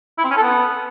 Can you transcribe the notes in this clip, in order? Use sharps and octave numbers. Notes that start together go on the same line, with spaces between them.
E4
C4
C#4
A4
B3